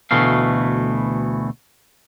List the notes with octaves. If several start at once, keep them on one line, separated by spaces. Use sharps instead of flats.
D2 B2 E3 A3 F5